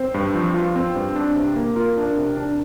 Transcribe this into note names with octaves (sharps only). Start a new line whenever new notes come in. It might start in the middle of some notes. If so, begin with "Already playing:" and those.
Already playing: C4 C5
G2
F3
F4
C4
G2
D4
C3
A#3
F4 A#4
D4 A#4
C3
D4